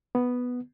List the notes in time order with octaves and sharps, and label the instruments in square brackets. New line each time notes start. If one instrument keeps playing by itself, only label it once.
[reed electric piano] B3